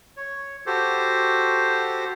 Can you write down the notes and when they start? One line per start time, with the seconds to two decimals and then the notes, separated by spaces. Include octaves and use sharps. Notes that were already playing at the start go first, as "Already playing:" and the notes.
0.17 C#5
0.66 F#4 G4 A4 C5